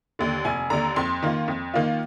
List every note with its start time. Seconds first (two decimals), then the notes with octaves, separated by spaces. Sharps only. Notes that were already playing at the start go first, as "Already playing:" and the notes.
0.19 D#2 D3
0.45 F1 G#5
0.70 D#2 D3 A#5
0.96 F2 C6
1.23 D#3 A#3 F4
1.48 F2
1.74 D#3 A#3 F4